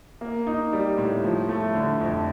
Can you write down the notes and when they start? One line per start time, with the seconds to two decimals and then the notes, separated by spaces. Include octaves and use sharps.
0.21 A#3
0.47 D#4
0.73 G3
0.98 A2
1.24 F3
1.49 A3
1.75 D3
2.00 F2